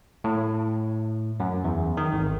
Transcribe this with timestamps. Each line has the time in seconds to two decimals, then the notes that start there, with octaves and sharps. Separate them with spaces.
0.24 A2
1.40 F#2
1.64 E2
1.97 D#3
2.13 G#1